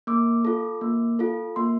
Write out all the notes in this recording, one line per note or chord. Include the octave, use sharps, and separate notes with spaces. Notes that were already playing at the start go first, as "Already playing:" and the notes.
A#3 D6
F4 A4
A#3
F4 A4
A#3 C6